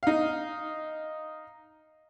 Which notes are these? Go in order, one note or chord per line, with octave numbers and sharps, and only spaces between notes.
D#4 F5